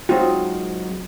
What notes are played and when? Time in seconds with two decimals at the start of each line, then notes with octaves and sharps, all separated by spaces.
0.09 F#3 G#3 C4 D#4 F4 F#4